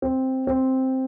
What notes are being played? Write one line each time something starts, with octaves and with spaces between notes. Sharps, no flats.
C4
C4